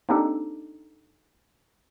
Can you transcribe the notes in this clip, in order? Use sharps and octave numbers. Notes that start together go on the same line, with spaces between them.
A#3 C4 D4 D#4 G4 A4